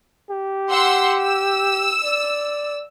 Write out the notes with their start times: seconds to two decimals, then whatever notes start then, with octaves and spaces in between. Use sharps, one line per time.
0.31 G4
0.70 F#5 C6 E6
1.20 E6
2.04 D5